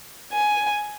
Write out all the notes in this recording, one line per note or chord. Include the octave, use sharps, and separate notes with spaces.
G#5